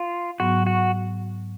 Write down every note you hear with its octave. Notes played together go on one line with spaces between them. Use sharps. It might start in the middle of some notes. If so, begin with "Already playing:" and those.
Already playing: F4
G#2 F#3 B3 F#4
F#4